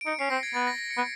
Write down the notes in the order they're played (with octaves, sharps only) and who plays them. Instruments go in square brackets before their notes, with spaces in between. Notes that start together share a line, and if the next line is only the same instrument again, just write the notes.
[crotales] D7
[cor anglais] D#4 [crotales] C#7
[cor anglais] C#4 [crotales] C7
[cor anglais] C4 [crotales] A#6
[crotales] G#6
[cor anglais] B3 [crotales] A6
[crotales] A#6
A#6
C#7
[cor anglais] B3